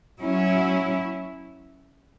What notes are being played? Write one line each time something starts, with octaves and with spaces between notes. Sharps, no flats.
F#3 C#4 E4